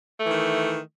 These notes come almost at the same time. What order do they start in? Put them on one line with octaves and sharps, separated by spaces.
A3 E3 D#3